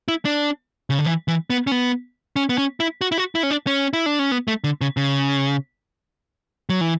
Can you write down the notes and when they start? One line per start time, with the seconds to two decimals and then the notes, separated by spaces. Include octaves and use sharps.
0.08 E4
0.25 D4
0.90 C#3
0.99 D3
1.06 E3
1.28 E3
1.50 B3
1.67 C#4
1.72 B3
2.36 C#4
2.49 B3
2.58 C#4
2.80 E4
3.01 F#4
3.12 E4
3.18 F#4
3.35 E4
3.43 C#4
3.51 D4
3.67 C#4
3.93 E4
4.06 D4
4.19 C#4
4.32 B3
4.48 A3
4.64 D3
4.81 C#3
4.97 C#3
6.69 F#3
6.81 E3